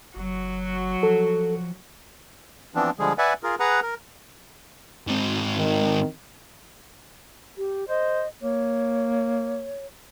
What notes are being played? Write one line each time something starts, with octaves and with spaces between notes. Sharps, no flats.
F#1 F#3 F#4
F3 A4
E3 F3 B3 C4 D4
D3 F3 G3 G#3 G#4
B4 D5 E5 F#5 G#5
F4 G#4 A#4
G#4 B4 F#5 A#5
A#4
G#2 C4
D#3
G4
C5 D#5
A#3 C#5